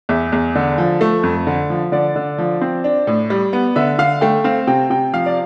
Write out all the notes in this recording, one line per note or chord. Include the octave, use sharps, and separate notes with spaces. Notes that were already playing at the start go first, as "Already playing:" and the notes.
E2 E5
E2
D3
F3
A3
F2
D3
F3
D3 D5
D3
F3
C4
D4
A2
G3
B3
D3 E5
D3 F5
A3 G5
C4 F5
C3 G5
C3 G5
F3 F5
D5